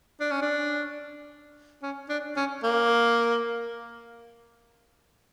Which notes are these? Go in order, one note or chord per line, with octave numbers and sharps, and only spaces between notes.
D4
C#4
D4
C#4
D4
C#4
A#3